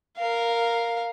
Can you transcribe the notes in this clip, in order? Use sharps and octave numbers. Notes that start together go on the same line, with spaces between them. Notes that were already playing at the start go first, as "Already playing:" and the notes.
A#4 F5